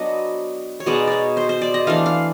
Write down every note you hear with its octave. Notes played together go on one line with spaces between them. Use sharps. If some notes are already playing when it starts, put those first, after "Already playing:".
Already playing: F#3 B3 D4 D#5
C#5
B2 G#3 B3 D#4 D5
C#5 D5
C5
C5
D5
D#5
E3 A3 D4 F5
F5